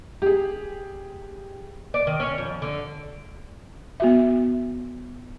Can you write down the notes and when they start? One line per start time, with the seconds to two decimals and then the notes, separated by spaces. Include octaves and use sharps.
0.22 G4 G#4
1.94 D5
2.07 D#3
2.20 C#4
2.38 F2
2.62 D3
4.00 B3 F#4 E5